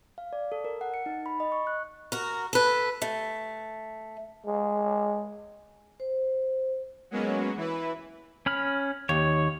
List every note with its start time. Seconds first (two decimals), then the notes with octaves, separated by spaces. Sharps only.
0.18 F5
0.33 D5
0.52 A4
0.65 A#4
0.81 F#5
0.94 C#7
1.06 D#4
1.26 B5
1.40 D#5
1.52 C#6
1.67 F#6
2.12 F#4 A#4
2.53 A4 B4
3.02 A3
4.46 G#3
6.00 C5
7.11 F#3 G#3 A#3 B3 C#4 F#4
7.56 E3 E4 B4
8.46 C#4 B5 F6
9.09 D#2 C#5